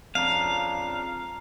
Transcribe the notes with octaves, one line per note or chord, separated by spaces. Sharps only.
F2 C#3 D4 F5 A#5 C7